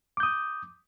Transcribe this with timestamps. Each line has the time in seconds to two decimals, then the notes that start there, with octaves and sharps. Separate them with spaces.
0.17 D6
0.20 G6
0.23 D#6